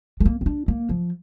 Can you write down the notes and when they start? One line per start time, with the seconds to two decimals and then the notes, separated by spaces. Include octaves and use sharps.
0.20 G#3
0.25 A#3
0.41 C4
0.46 D4
0.68 A#3
0.89 F3